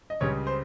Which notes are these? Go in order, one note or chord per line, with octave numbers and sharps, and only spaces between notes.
D#5
C#2 C#3 G3 C#5
C5